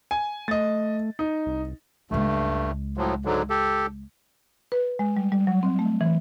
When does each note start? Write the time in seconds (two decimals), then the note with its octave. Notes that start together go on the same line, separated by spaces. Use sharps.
0.11 G#5
0.48 A3 D#5 A6
1.19 D#4
1.46 C2
2.11 C#2 G2 G#3 A3
2.97 A2 F3 F#3
3.25 G#2 D3 F#3
3.50 G4 A4
4.72 B4
4.99 G#3
5.17 G3
5.32 G3
5.47 F#3
5.63 C4
5.79 A3
6.01 E3